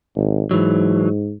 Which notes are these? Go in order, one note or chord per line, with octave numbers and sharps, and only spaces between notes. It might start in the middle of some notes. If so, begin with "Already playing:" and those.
G#1
G#2 E3 F#3